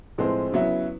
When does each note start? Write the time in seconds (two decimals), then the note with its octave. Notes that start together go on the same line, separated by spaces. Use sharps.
0.18 A2 F3 G#3 C4
0.52 C#3 F#3 B3 E4